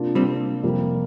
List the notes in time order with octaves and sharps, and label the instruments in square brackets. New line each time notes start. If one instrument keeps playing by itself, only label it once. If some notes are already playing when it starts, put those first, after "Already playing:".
Already playing: [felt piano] C3 A#3 D4 F4
[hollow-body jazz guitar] G3 C4
[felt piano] F2 C3 G3 A#3